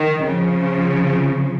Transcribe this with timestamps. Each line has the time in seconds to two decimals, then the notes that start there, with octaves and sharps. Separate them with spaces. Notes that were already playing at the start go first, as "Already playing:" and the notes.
Already playing: D#3
0.23 C#3 F3